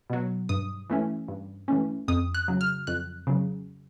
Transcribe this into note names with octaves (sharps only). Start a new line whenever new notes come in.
B2 F#3
G2 D#6
E3 A3 C#4
G2
E3 A3 C#4
F2 D#6
F#6
C#3 F#3
F6
F2 F#6
C#3 F#3